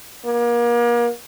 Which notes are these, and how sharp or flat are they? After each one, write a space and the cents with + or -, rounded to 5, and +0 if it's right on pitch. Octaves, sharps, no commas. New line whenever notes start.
A#3 +35